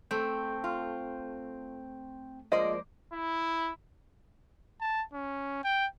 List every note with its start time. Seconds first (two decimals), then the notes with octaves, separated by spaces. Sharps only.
0.11 A3 C4 C5 G5
0.64 F4
2.52 F3 G#3 A#3 C5 D5 D#5
3.13 E4
4.81 A5
5.13 C#4
5.64 G5